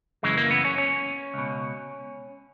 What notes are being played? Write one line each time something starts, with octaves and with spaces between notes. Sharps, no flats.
F#2 C#3 E3 G#3
A#3
B3
C#4
C#4
C#2 B2